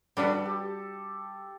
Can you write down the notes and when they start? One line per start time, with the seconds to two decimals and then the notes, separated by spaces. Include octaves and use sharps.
0.17 G3 D4 F#4 A4 B4
0.45 G4